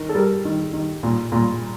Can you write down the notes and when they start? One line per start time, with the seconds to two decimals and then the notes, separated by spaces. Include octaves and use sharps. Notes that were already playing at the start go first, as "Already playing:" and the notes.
Already playing: D#3 A#4
0.09 A4
0.15 G3 A#4
0.45 D#3
0.73 D#3
1.03 A#2
1.32 A#2